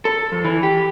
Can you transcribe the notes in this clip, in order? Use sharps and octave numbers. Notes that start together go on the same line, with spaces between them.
A4
F2
E3
G4